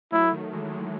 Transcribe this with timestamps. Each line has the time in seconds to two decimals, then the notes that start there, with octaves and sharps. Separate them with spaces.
0.12 F#3 A3 E4
0.33 D#3 F#3
0.53 E3 G#3
0.65 E3
0.73 D#3 F#3